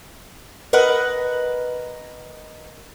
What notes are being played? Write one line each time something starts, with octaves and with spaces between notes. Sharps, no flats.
A#4 B4 D#5 F#5